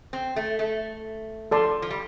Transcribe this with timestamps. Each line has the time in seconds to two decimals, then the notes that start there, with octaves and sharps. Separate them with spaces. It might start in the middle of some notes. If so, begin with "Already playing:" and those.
0.13 C4
0.36 A3
0.59 A3
1.51 F3 A4 D5 A5 C6
1.82 F3
1.91 G3